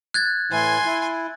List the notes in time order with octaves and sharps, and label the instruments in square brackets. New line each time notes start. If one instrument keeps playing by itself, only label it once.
[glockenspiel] F#6 G#6 A6
[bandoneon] A2 E3 E4 [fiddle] G#5 C6
[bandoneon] E4